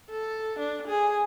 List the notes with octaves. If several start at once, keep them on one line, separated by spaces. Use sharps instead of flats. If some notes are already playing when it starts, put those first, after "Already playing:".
A4
D4
G#4